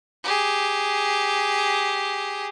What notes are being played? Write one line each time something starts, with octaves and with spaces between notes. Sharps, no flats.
G4 G#4